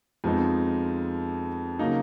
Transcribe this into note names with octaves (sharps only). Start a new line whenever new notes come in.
F2 F3 G#3 B3 D#4
C#3 F#3 A#3 D#4